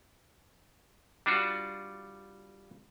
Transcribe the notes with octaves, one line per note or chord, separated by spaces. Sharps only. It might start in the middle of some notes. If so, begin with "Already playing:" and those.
G3 D4 F4 F#4